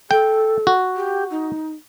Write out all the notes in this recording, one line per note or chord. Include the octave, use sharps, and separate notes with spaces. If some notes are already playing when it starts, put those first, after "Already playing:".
A4 G5
F#4
G4
D#4